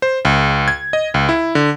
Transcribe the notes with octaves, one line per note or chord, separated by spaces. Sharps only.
C5
C#2
G#6
D#5
C#2
E4
D3